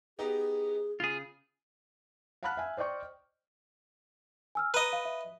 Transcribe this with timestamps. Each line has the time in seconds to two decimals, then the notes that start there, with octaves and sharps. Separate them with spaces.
0.19 B3 D#4 G4 G#4
1.00 C#3 F4 G#4
2.43 F5 F#5 A5 B5 F6 F#6
2.57 E5 G#5
2.77 C5 D5 D#5 G5 C#6
4.55 G#5 E6 F6
4.74 B4 D#5 A#5 B5
4.93 F5
5.05 E5